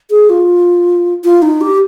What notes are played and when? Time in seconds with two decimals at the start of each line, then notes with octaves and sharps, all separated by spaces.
0.10 G#4
0.29 F4
1.24 F4
1.42 D#4
1.61 G4